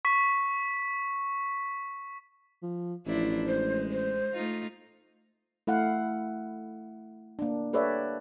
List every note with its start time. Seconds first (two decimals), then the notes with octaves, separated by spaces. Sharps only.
0.05 C#6 B6
2.63 F3
3.07 A1 F3 D4 E4
3.47 G#3 C5
3.92 C5
4.33 A3 D#4 F4
5.67 A3 E4 F5 F#5
7.39 A#3 D4
7.73 G4 A4 B4 C#5 D5 E5